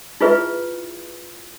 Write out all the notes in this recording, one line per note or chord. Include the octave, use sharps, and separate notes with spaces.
E4 F4 G#4 B4 E5